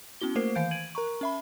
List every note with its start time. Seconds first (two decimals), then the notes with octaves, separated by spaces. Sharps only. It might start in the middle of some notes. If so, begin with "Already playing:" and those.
0.21 B3 C#4 E4 F#4 G7
0.35 A3 A#3 A#4 C5 C7
0.55 D#3 E3 F5 G6 D7
0.71 G#6 D7 D#7 F#7
0.95 A#4 A#5 C#6
1.21 C#4 E5 B5